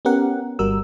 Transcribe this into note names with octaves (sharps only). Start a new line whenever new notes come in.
B3 C#4 G4 A#4 F#5
G1 G3 F#4 A#4 E6